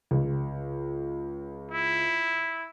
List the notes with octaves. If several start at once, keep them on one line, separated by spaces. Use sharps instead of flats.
C#2
E4